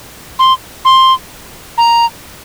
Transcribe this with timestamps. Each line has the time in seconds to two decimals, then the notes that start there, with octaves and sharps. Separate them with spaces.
0.39 C6
0.85 C6
1.78 A#5